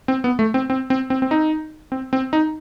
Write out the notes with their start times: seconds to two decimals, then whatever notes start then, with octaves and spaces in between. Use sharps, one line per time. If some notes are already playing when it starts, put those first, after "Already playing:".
0.08 C4
0.24 B3
0.39 A3
0.54 C4
0.70 C4
0.90 C4
1.10 C4
1.22 C4
1.31 D#4
1.92 C4
2.13 C4
2.33 D#4